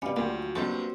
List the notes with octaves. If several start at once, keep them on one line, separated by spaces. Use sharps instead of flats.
B2 G3 C#4 F5 G#5
D2 A#2 F#3 A#3 F4 G5
G2 B2 F#3 A#3 C4 F#4 A4